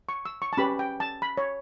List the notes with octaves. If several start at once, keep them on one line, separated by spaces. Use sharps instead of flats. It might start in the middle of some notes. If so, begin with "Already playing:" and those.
C#6
E6
C#6
A5
C#4 G4 B4 B5
G5
A5
B5
C#5